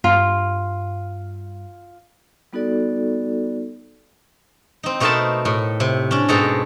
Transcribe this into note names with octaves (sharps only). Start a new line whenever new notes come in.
G2 F4
G3 B3 D#4 F#4 A4 D5
C4 D#4
B2 A3 D#4 A#4 C5 A5
A2
C3
C#4 D4
G#2 B2 G#4 A4 G5 A#5